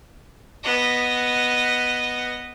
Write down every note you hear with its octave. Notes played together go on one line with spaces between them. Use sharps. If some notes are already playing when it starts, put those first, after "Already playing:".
B3 D#5